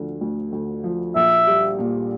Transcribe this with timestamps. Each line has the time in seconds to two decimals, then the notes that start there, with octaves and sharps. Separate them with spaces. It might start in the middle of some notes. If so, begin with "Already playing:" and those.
Already playing: D2 D3 F3
0.21 D2
0.52 D2
0.84 F3
1.15 A#1 E5
1.47 G3
1.79 A#2